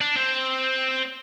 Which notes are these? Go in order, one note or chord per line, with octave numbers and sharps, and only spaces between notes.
D4
C4